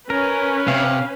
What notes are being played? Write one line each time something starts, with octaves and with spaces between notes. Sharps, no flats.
C#4 A#4 B4
C3 F5